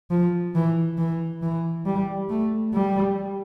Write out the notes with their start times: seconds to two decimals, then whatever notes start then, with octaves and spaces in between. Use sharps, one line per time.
0.11 F3
0.55 E3
0.98 E3
1.42 E3
1.86 G3
2.30 A3
2.74 G3